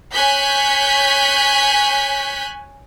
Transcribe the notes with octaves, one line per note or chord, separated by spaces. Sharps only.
C#5 G#5 F#6 G6 B6